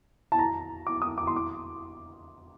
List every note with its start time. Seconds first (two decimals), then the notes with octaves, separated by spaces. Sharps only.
0.32 A5
0.39 A#5
0.87 D6
1.02 D#6
1.18 D6
1.27 C6
1.36 D6